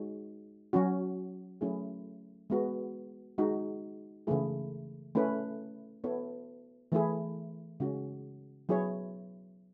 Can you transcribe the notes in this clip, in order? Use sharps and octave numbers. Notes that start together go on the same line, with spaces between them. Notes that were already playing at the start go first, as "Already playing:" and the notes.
Already playing: G#3 D#4 F#4 C#5
F#3 C#4 F#4
F#3 A3 C#4 E4 G#4
G#3 B3 F#4
G#3 D#4 F#4
C#3 E3 A3 E4 G#4
A3 C#4 E4 B4
B3 E4 A4 C#5
E3 A3 E4 G#4
C#3 G#3 C#4 F#4
F#3 B3 E4 G#4 C#5